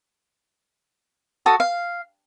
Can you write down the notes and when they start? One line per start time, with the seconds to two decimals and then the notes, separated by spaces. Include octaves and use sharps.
1.46 F#4 A4 D#6
1.60 F5